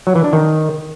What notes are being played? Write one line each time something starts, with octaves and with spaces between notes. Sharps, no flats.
F#3
E3
D4
D#3